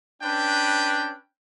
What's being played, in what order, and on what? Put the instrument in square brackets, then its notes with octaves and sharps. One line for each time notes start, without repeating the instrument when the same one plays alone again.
[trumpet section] C#4 D4 B4 G5